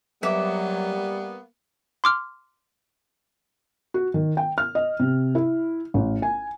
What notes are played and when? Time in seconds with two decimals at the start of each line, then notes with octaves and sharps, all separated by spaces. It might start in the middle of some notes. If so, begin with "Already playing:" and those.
0.23 F#3 G3 A#3 B3 E5 D6
2.04 C6 D6 F6
3.94 F#4
4.14 D#3
4.37 G5
4.58 F6
4.75 D#5
5.00 C3
5.35 E4
5.94 A1
6.22 G#5